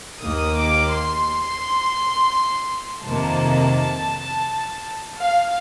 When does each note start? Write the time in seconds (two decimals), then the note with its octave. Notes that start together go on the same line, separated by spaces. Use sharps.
0.22 D#2 D#3 A#3 D#6
0.58 D6
0.93 C6
3.05 F2 C3 D#3 A#3 A5
5.19 F5